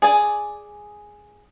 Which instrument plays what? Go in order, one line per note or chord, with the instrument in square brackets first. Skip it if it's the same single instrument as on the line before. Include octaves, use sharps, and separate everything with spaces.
[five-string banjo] G#4 D5 G#5